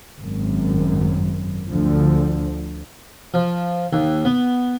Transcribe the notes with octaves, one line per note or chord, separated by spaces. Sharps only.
G#1 F#2
D2 D3 F3
F3
D#2
B3